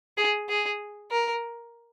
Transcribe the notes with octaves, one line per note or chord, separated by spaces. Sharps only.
G#4
G#4
A#4